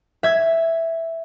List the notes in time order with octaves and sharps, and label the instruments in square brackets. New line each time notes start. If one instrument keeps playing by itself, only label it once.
[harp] E5 G#6